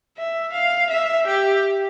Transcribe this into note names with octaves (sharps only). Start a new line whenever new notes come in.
E5
F5
E5
G4